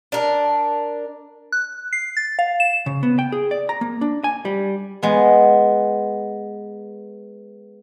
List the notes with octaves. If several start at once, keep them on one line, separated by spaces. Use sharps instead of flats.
D4 A#4
F#6
C7
A6
F5
E7
C#3
B3
G5
G#4
D5
A#5
A#3
D4
G#5
G3
G#3 B3